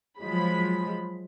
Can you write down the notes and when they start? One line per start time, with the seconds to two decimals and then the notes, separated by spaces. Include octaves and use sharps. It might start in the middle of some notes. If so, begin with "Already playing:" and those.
0.19 F3 F#3 G#3 B5